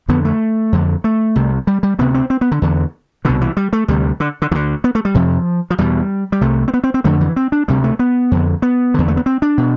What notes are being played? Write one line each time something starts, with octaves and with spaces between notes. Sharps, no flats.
F2 D3 B3
A3
F2 D3
A3
C2 C3
G3
G3
D2 C3 B3
C4
C4
B3
D3
E2 D3
C2 B2 D3
E3
G3
A3
D2 C3 G3
D3
D3
D2 D3 E3
B3
A3
G3
F2 C3 F3
F3
E2 B2 G3
G3
C2 C3 A3
C4
B3
C4
C4
F2 D3 A3
E3
C4
D4
D2 C3 G3
A3
B3
F2 D3
B3
E2 D3
A3
B3
C4
D4
B2